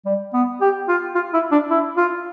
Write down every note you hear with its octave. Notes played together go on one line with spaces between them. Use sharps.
G3
B3
G4
F4
F4
E4
D4
E4
F4